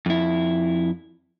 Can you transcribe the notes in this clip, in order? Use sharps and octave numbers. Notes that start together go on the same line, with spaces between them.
F2 E4